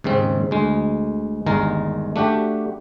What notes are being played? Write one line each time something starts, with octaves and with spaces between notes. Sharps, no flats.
D#2 G#2 C#3 C4
D2 G#3
G1 D#2 G#3 A#4 A#5
A3 D4 F#4 G4